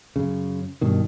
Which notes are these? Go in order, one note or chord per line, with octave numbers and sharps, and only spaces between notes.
F#2 C#3
G2 B2 D#3